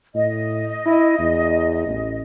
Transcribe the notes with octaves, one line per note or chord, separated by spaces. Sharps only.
A2 D#5
E4
E2
A1